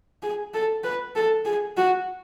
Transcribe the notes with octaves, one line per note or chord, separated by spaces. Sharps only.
G#4
A4
B4
A4
G#4
F#4